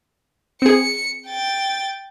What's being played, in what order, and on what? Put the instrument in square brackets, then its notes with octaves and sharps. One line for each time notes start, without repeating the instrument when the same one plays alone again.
[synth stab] C4 G#4 [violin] C#7
[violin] G5 A6